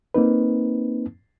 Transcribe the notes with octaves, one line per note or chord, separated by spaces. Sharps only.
A#3 C4 D#4 B4